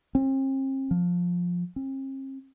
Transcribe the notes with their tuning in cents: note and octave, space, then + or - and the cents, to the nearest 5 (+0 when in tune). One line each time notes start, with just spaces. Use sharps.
C4 +40
F3 +15
C4 +45